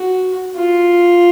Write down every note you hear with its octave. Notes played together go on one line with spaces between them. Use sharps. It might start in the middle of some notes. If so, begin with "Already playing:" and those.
Already playing: F#4
F4